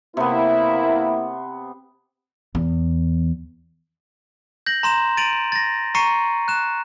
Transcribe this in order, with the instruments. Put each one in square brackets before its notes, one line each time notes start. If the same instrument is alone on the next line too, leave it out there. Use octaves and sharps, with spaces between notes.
[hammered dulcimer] C3 B3 [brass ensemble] A#3 E4
[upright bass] E2
[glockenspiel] G6 A#6 F#7
A#5 C6 E7
A6 D7 D#7 F7 F#7
A6 A#6
A#5 C#6 C7 C#7 D#7
F#6 E7